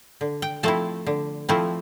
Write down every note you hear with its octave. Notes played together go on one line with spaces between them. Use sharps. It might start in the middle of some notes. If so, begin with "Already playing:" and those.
D3
G5
F3 A3 C4 E4 A5
D3
F3 A3 C4 E4